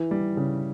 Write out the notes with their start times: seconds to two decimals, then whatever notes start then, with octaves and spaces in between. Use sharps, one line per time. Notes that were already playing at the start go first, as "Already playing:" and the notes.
Already playing: E3
0.11 G3
0.37 C#3